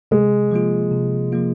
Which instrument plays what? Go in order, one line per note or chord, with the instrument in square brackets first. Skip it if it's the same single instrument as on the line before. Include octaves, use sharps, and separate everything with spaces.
[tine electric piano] C3 [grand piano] G#3
[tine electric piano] F3 A#3 F4
C3
F3 A#3 F4